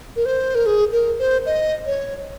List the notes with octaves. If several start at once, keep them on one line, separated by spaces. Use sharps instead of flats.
A#4
C5
A#4
G#4
A#4
C5
D#5
C#5